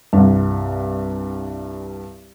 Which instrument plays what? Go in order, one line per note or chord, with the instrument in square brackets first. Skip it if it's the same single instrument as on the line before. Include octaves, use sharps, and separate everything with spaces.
[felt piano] C2 G2